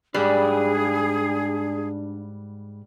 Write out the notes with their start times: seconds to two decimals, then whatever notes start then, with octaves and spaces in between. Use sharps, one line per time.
0.14 G#2 G3 D4 G4 G#4 B4